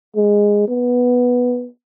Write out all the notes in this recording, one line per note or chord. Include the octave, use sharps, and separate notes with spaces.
G#3
B3